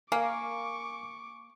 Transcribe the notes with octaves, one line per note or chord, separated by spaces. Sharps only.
A#3 A#4 F5 G#5 C#6 D6